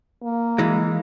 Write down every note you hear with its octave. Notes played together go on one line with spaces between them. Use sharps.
A#3
E3 G#3